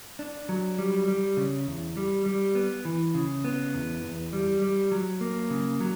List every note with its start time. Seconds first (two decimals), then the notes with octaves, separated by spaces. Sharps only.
0.19 D4
0.49 F#3
0.78 G3
1.08 G3
1.37 C#3
1.67 E2
1.97 G3
2.26 G3
2.55 B3
2.85 E3
3.14 C#3
3.44 B3
3.74 E2
4.03 E2
4.33 G3
4.62 G3
4.92 F#3
5.21 A#3
5.50 C#3
5.80 F#3